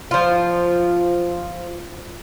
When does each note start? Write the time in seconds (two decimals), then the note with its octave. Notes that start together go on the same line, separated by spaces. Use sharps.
0.11 F3 F4